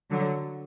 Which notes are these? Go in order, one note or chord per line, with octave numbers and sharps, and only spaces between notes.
D3 F#3